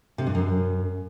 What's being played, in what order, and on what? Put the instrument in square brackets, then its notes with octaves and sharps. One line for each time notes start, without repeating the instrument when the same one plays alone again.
[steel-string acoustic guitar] C3
G2
F#2